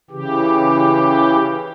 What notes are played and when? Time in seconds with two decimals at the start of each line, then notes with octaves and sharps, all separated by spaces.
0.11 C#3 E3 G4